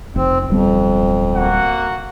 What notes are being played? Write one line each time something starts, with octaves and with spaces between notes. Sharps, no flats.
F1 C4
D1 F2 G3 B3
A#3 F#4 F#5